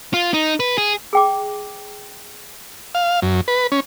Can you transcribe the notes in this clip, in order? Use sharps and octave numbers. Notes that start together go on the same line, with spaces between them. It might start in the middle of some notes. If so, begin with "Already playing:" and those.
F4
D#4
B4
G#4
G#4 G5 D6
F5
F#2
B4
C#4